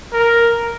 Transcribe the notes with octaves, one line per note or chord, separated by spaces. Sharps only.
A#4